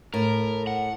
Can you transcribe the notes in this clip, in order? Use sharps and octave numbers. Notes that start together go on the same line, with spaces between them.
A2 A#4
F#5